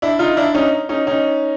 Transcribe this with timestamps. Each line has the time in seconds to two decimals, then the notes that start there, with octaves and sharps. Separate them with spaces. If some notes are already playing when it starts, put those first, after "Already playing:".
0.02 D4 E4
0.19 D#4 F4
0.37 D4 E4
0.55 C#4 D#4
0.89 C#4 D#4
1.07 C#4 D#4